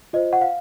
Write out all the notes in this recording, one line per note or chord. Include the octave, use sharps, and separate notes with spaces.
F4 C5 D#5
F#5
F5